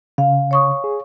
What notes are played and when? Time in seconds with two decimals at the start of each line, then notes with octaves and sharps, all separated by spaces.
0.18 C#3 F5
0.51 C#5 C#6 D#6
0.84 G#4